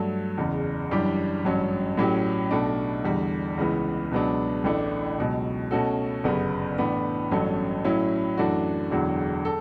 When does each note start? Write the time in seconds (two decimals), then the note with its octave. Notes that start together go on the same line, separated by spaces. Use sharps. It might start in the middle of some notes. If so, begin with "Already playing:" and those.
Already playing: G2 F#3 A3
0.38 F#1 E2 C#3
0.91 F#2 E3 G3 D4 G4
1.45 A1 G2 F#3 C#4
1.97 A2 F#3 C#4 G4
2.51 B1 B2 A3 D4
3.04 E2 D3 G3
3.58 C#2 C#3 E3 B3
4.11 C#2 B2 F#3 B3 D4
4.64 A1 A2 E3 A3 D4
5.18 C#2 B2 F#3
5.71 B2 A3 C#4 F#4 A4
6.24 G1 F#2 C#3 G3 B3
6.78 A2 E3 B3 D4
7.31 A1 G2 F#3 A3 C#4
7.85 A2 F#3 C#4 E4
8.38 F#2 E3 A3 D4 F#4
8.91 E1 E2 D3 F#3
9.45 A4